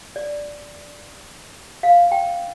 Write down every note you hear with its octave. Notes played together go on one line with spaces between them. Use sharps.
D5
F5
G5